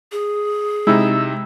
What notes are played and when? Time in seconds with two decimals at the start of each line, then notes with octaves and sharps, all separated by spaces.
0.12 G#4
0.87 C3 G#3 D#4 E4 E6